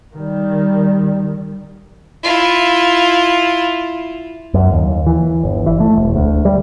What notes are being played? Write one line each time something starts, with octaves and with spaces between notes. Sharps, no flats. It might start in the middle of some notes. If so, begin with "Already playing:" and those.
D#3 G3
E4 F4
F#2
D#2
E3
G1
E3
A3
E1
D2
G3